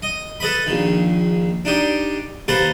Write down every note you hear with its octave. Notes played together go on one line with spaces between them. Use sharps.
D#5
A4 B4 D#5 B5
A#1 D#3
D4 D#4 G4
D#2 A4 B4 C5 A#5